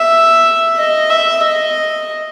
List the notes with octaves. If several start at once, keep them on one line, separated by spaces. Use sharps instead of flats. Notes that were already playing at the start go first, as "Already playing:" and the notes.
Already playing: E5
D#5
E5
D#5